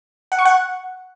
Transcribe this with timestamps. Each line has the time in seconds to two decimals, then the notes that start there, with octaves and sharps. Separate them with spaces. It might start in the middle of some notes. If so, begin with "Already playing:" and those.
0.32 F#5
0.39 C#6
0.45 F#5